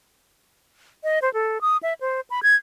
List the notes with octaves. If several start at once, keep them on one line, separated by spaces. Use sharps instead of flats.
D#5
C5
A4
D#6
E5
C5
B5
G#6